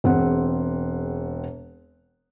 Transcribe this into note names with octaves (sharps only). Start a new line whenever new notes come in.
E1 C4 G#4 F#5